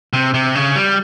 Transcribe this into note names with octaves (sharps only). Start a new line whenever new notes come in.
C3
C3
C#3
G3